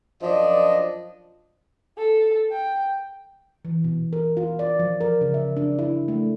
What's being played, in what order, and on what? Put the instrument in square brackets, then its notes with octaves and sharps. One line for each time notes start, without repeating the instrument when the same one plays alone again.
[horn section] F#2 F3 D4 D5 D#5
[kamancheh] A4
G5
[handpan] E3
B2
A#4
F4
D5
F3
A#4
C#3
E5
D4
E4
A3